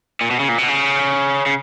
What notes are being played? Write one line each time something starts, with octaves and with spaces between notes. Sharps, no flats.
A#2
B2
C#3
A#2
B2
C#3
C#3